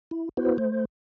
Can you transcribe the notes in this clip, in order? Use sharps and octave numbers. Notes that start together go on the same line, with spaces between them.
E4
B3 E4 F#4 B4 C5
A3 C5